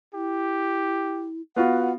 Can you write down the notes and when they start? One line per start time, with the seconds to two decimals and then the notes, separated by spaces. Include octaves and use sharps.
0.14 E4 G4
1.56 B3 F4 F#4 F#5